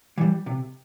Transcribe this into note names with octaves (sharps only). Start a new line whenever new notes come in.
E3 G3
C3